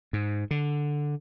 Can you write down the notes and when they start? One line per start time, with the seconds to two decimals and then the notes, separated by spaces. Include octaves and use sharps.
0.13 G#2
0.51 D3